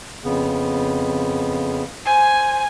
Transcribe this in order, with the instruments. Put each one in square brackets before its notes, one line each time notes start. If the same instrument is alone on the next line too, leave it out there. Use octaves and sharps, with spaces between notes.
[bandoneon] F2 C#3 B3
[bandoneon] C5 [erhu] G#5